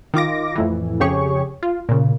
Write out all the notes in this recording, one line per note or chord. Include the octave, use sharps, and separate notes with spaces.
D#3 F4 D6 A#6
F2 A2 E3
F2 C#3 G4 G#4 C#5 C#6
F4
A#2 C#3